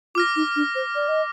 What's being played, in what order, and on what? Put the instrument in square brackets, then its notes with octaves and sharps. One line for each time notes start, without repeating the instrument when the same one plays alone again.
[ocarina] F4 [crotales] D6 F6 A#6
[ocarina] D#4
D4
C5
D5
D#5